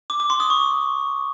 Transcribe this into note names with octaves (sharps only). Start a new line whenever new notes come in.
D6
D6
C6
D#6
C#6